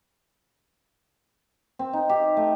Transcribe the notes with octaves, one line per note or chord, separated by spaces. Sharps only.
C4
D#4
G4
A3